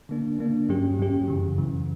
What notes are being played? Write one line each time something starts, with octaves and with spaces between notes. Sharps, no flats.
D3 A#3 D4
D3 A#3 D4
G2 F#3 C#4 G4
G2 F#3 C#4 G4
F#2 C#3 E3
F#2 C#3 E3